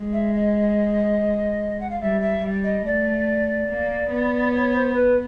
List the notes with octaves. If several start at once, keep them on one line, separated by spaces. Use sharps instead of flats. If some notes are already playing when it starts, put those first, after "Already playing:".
Already playing: G#3
E5
D#5
F#5
F5
G3 E5
E5
G3
D#5
A3 D5
A#3
B3
C#5
C5
B4